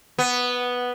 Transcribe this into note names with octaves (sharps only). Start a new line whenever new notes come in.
B3